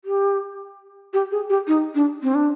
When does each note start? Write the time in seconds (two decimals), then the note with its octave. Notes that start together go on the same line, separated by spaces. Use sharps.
0.05 G4
1.13 G4
1.32 G#4
1.50 G4
1.68 D#4
1.95 D4
2.23 C4
2.35 D4